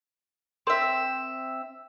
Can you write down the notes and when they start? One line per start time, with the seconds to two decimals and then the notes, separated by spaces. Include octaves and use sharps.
0.67 C4 A#4 E5 C6